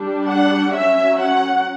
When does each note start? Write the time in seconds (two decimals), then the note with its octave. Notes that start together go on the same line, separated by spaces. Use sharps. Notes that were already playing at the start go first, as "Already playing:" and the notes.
Already playing: G3 D4
0.28 F#5
0.74 F#3 C#4 E5
1.20 F#5